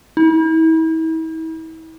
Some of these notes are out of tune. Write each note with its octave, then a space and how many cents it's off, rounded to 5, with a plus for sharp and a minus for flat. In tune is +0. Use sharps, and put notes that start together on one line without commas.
E4 -40